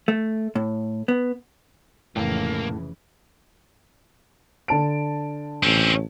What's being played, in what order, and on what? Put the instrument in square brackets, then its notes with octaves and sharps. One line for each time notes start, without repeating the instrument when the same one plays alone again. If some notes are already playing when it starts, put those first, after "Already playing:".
[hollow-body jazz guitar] A3
A2
B3
[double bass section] F1 C#3 E3 [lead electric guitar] C#2 A#3 [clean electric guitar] A2
[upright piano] D3 A5 D7
[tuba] A1 [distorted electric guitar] C4 C#4